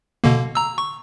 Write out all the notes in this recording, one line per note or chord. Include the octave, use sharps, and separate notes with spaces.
B2 D3 A#3
A#5 E6
C#6